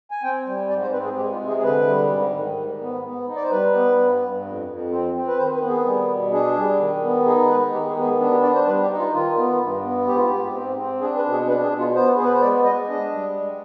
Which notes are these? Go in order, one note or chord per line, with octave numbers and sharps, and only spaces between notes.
G#5
C4 G5
G3
G#2 D5
C5
C4 B4
G#4
G#3 G4
F4
C3
G#4
G#4
D3 B4
G3
G#2
D#3
G#2
B3
B3
D#4
D5
C5
G3 B4
B3
G2
G2
F2
F2
C4
C4
B4
D#3 C5
B4
B3
G#4
G3
B2
D4 G#4
G3
D#3
B3
D#4 G#4
G#3 B4
D#3 G4
G#4
B3
G#4
D4
G4
D4 D5
C5
G3 B4
G4
D#4
F4
D#3 F4
B3
G2
B3
G#2 G4
F4
G#2 G4
C4
C4
D4 G#4
B4
B2
G#4
D4 B4
G#4
B2
F4
B3 C5
B3 G#4
B4
C5
G#3 D5
G#3 D#5
D4 D#5
G3
G#3